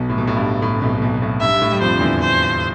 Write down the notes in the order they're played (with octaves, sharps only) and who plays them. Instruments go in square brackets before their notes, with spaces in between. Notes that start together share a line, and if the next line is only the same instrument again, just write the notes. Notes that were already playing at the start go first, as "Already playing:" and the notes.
Already playing: [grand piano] B1 B2
A2
B2
A2
G2
A2
C3
B1 B2
B1 B2
B2
A2
[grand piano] G2 [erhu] E5
[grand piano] G2
A2
G3
[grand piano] F2 F3 [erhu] C5
[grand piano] D3
E2 E3
[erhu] C5